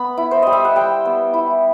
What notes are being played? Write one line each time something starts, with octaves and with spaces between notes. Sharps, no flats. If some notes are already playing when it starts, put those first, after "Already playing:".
Already playing: B3 B5
E4
C5
G3 D#5
E5
F#5
G3 G5
B3
E4